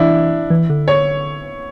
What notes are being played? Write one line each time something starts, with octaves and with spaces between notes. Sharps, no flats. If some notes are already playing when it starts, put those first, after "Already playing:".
Already playing: E3 D4 E4
E3
D3
C#5